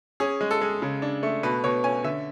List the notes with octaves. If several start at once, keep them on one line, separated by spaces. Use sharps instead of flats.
C#4 G#4
G#3
A4
G#3
C#3
D4
A3
B2 B4
B2 C#5
C#4 G#5
D3 E5